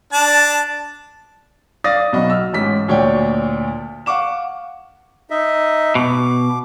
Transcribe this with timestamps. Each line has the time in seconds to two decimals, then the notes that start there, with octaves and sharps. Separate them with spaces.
0.13 D4 A5
1.84 D5 F5 D#6 A6 A#6
2.13 B1 B2 F#4 D#5 B5
2.30 E6 F6
2.53 A1 G#2 B6
2.88 D2 A#2 C#5 D5 F#5 G5
4.06 F5 F#5 C#6 D6 E7
5.30 D#4 D#5 E5
5.95 B2 D6